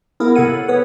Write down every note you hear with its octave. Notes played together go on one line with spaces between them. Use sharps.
A#3 B3 E4 G#4 A#4
C3 A4 C#5 F#5 D#7
B3 G#4 B4 C#5